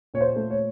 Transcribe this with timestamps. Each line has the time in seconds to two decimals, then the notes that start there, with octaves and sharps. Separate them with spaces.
0.14 A#2 C#5
0.21 C5
0.36 A3
0.50 C#5